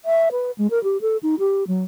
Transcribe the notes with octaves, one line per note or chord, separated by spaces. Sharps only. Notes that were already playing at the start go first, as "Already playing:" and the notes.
E5
B4
G#3
A#4
G4
A4
D#4
G4
F#3